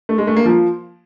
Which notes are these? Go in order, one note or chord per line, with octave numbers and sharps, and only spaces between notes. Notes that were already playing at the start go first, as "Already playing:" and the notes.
A3
G#3
A3
A#3
F3